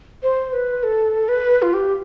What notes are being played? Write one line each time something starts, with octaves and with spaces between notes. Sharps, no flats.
C5
B4
A4
B4
F4
G4